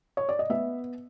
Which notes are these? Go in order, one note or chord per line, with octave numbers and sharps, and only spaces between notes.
C#5
D5
D#5
B3 E5